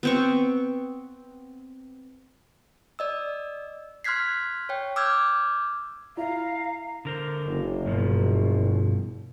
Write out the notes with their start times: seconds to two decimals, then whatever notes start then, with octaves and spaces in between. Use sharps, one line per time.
0.03 B3 C4 C#6
2.99 D5 D#5 E6
4.04 C6 F6 F#6 G#6 B6 C7
4.69 C#5 G5
4.96 D6 E6 F6 G6 G#6
6.17 E4 F5 A#5
7.05 D3 A#4 C5
7.45 F#1
7.86 G2 B2 F3